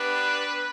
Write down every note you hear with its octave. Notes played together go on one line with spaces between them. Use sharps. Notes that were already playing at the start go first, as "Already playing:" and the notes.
Already playing: B3 D4 G4 B4